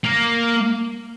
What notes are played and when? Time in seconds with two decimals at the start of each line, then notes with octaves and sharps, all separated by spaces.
0.04 A#3